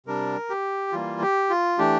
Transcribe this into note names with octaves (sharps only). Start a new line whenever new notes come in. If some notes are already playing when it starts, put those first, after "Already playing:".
C3 G3 D4 A#4
G4
E3 G3 A#3 F4
G4
F4
E3 A3 D4 G4